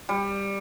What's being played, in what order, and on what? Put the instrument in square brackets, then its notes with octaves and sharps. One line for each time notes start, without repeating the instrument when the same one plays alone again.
[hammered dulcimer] G3